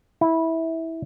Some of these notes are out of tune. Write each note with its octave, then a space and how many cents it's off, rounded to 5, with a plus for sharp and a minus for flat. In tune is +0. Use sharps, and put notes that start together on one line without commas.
E4 -15